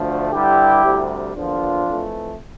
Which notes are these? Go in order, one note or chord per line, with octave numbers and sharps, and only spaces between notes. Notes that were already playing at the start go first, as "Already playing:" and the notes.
Already playing: D2 D3 F3 A3
G2 D3 G3 E4 G4
D2 C3 G3
E2 D3 F3 A#3 D4 F4
F2 E3 A3